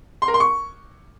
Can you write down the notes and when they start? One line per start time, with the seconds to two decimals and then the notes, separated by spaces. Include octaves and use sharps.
0.22 C6
0.28 A#4
0.34 C6
0.40 C#6